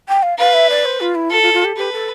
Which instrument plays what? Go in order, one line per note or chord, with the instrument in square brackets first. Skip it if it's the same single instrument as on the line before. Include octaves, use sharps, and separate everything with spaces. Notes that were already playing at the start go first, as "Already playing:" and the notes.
[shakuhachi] G5
F5
[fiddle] B4 [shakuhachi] F5
[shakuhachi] E5
D5
C5
F4
E4
[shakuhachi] F4 [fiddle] A4
[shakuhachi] F4
F4
G4
[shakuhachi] G4 [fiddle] B4
[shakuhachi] A4